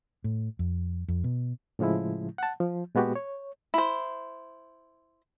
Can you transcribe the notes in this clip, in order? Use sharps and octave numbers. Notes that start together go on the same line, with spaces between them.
A2
F2
F2
B2
A2 C#3 F3 G#3 E4
F#5 A5
F3
A#2 G#3 B3 F#4 G4
C#5
E4 C5